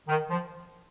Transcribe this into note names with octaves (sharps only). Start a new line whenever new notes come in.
D#3
F3